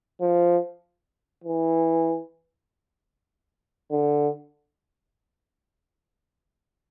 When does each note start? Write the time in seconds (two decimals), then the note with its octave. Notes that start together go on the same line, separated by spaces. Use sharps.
0.21 F3
1.44 E3
3.91 D3